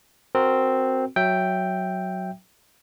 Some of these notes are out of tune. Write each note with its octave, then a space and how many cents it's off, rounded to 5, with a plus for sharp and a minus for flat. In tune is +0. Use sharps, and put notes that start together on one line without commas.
C4 +0 F#4 +0 A#4 -10
F#3 +0 E5 +0 G5 +0